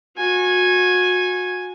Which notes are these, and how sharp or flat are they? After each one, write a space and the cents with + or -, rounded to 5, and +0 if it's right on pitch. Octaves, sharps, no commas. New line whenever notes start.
F#4 -30 G#5 +0